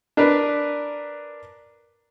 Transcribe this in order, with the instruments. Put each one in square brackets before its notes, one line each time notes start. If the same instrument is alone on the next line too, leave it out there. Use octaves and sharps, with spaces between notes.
[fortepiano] D4 A#4 B4